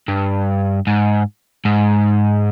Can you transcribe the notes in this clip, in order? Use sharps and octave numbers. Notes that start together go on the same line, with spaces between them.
G2
G#2
G#2